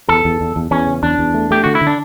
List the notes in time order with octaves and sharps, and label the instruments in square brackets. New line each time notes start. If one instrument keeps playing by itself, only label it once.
[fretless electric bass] E2 [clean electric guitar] A4
[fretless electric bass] E2
E2
E2
[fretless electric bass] E2 [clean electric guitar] C#4
[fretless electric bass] C#3
[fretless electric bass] E2 [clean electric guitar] D4
[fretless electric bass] E2
A3
[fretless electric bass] A3 [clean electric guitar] G4
[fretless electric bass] D3 [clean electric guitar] F#4
[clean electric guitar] E4
[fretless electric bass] D3
[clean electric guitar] D4